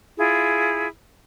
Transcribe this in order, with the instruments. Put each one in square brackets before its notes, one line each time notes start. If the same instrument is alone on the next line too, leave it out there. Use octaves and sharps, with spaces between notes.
[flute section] E4 F4 G#4